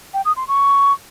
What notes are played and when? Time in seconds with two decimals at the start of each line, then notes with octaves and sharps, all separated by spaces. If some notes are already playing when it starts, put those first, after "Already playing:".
0.14 G5
0.25 D#6
0.37 C6
0.48 C#6